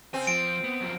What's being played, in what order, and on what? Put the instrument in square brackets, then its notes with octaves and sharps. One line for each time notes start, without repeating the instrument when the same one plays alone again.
[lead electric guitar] C#3 G#5 [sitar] C4
[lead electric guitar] F3 [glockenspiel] D7
[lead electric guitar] B3
F#2 F3